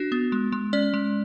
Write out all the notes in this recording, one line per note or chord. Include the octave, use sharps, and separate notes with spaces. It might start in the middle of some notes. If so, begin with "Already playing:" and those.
Already playing: D4 F#4
B3
G#3
G#3
C#4 D5
G#3